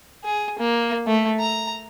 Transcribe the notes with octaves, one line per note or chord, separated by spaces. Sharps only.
G#4
A#3
A3
A#5